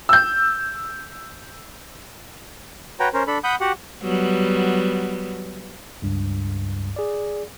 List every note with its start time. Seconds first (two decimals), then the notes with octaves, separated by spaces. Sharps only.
0.09 E6 G6
3.00 F#4 B4 C#5 G5 A#5
3.14 C#4 A#4 C5
3.27 D4 A4 B5
3.44 F#5 B5 D#6 G6
3.61 F#4 G4 F#5
4.03 F#3 G3 B3
6.02 C#2 G2
6.96 G#4 D5